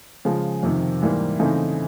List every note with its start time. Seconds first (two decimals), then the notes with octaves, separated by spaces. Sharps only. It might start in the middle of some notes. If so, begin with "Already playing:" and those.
0.25 C#3 F3 G#3
0.63 F2 C3 D#3
1.02 G#2 E3 G3 A#3
1.40 C#3 E3 A3 C4 D#4